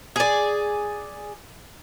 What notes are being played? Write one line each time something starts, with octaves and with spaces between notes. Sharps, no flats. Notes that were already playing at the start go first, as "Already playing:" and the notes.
G#4 D5